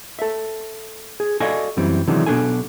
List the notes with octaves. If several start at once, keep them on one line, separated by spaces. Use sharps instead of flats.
A4 E5
G#4
F#4 A4 D5 D#5 F5 G#5
F#2 E3 G3 C4
C3 D#3 E3 F#3 G#3 D4
B1 B2 C4 D4 A4 G#5